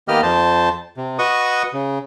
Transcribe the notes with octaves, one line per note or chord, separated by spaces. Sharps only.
D#3 A#3 B3 G4 D#5 F6
F2 C5 A5
C3
F#4 B4 D#5 C#6 D#6
C#3